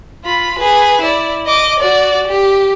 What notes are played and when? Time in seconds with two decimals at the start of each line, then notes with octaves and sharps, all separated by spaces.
0.24 F4 B5
0.59 G#4 B4
1.01 E4 D5
1.46 D#5 D6
1.80 F#4 D5
2.27 G4